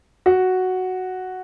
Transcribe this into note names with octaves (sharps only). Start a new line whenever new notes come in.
F#4